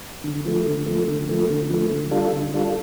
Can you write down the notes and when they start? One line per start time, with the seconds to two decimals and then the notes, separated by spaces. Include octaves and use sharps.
0.24 D3
0.46 F3 A3
0.66 D3
0.86 F3 A3
1.08 D3
1.29 F3 A3
1.50 D3
1.70 F3 A3
1.91 D3
2.11 G3 D4 F4 A4
2.32 D3
2.54 G3 D4 F4 A4